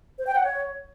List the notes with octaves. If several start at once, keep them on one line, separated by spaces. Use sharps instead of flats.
C5
G5
F#5
C#5